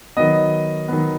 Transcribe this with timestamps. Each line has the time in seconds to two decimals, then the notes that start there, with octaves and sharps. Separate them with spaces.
0.17 D#3 F#3 B3 D#5
0.88 D#3 F#3 B3